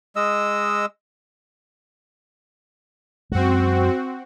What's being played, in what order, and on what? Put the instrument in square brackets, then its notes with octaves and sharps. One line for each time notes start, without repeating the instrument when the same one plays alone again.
[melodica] G#3 D#5 E6
[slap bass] F#2 G#3 [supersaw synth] C4 F#4